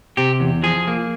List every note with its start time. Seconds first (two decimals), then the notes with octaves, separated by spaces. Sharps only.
0.17 C3 G4
0.40 E2
0.63 F3 G#4
0.87 A#3